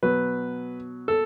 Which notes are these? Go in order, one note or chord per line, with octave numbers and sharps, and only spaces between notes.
B2 F#3 B4
A4